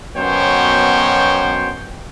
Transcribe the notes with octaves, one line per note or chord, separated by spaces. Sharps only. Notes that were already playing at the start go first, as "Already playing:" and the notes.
F#2 B2 B3 C5 C#5 G5